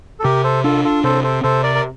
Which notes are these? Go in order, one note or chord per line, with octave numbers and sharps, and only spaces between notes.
A4
C3 G4 A#4
A4 C5
D4 F4 A4
F4 A4
C3 A4 C5
A4 C5
C3 A4 C5
A#4 D5
A#4